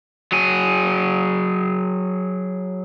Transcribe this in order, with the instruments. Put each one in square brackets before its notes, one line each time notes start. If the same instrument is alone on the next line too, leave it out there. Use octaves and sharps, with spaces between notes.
[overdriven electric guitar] F#3 G#4